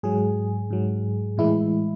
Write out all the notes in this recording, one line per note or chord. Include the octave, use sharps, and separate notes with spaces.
G#2 F#3 G#4
G#2 F#3
A2 E3 G#3 E4